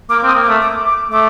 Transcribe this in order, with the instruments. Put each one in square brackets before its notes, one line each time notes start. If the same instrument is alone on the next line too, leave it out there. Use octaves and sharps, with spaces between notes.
[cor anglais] A#3 [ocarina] D6
[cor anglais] C4
[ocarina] D#6
[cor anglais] A#3
[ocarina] D6
[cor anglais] A3
[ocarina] D6
D6
[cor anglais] A3 [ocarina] D6